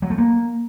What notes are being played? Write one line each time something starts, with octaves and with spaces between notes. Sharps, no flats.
F#3
A3
A#3